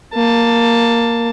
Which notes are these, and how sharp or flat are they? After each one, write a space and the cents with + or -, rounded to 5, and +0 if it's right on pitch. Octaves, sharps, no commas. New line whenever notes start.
A#3 +0 A5 +10